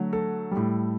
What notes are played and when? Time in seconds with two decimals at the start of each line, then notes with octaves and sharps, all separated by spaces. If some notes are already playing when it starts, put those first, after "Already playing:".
Already playing: D3 F#3 A3
0.13 A4
0.51 G3
0.57 A2